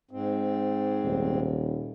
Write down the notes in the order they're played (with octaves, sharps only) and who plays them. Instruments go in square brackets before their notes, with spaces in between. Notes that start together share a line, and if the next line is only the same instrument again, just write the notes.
[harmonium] G#2 C4
[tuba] D#1